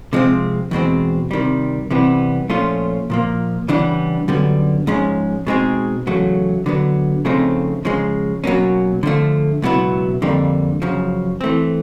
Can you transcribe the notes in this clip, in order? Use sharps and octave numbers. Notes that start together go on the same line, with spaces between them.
C3 F3 G#3 C4
E2 B2 G#3 C4
C3 D#3 G3
C3 E3 G3 B3
A#2 F3 A3 C#4 F4
A#2 F3 A#3
C#3 E3 G3 B3 D4
F#2 D3 G3 B3
G#2 F3 G#3 C#4
B2 G#3 C4 D#4 G#4
E2 C#3 F#3 A3
D3 F#3 B3
C#3 F3 A3 C4 D#4
C#3 F3 G#3
B2 F#3 A#3 C#4
D3 F3 A3
C#2 B2 F#3 B3 E4
F2 D3 G3 A#3
F#2 C#3 F3
E3 A3 C4